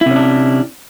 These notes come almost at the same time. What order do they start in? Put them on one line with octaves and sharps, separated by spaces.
E4 C3 C#4 D4